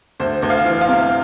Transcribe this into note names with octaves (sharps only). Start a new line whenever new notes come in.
D2 C5
D2
F5
E3
F5
C3